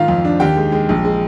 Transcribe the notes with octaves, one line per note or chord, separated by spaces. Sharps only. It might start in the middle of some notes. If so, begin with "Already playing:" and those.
Already playing: G#2 D#3 F4 F5
F2
D4
D#2 G4 G5
G#3
G#3
A#1
G#3